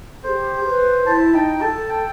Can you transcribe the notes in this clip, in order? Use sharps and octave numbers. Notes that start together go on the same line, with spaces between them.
G4 A4 C5
B4
E4 A5
D#4 G5
A4 A5
G5